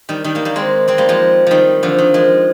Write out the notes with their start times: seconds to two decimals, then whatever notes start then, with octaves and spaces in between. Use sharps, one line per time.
0.09 D#3 G3
0.24 D#3 G3
0.35 G3 A#3
0.45 G3 A#3
0.56 G#3 C4
0.88 G#3 C4
0.98 G3 A#3
1.09 F3 G#3
1.47 D#3 F3 G3
1.83 D3 F3
1.98 D#3
2.14 F3 G#3